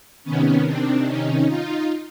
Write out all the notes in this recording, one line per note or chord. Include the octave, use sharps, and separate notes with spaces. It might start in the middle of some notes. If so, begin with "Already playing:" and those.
C3 D#3 B3 C#4
C4 D4
C#4 D#4
D#4 F4